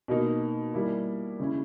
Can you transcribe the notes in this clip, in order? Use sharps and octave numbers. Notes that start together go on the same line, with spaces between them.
B2 A#3 D#4
G3 A#3 E4
C#3 G#3 C#4 E4